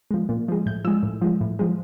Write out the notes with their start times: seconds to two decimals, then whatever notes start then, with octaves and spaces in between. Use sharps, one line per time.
0.11 F3 G#3
0.29 A#2
0.48 F3 G#3
0.66 A2 G6
0.84 F3 G#3 E6
1.03 A2
1.22 F3 G#3
1.41 A2
1.59 F3 G#3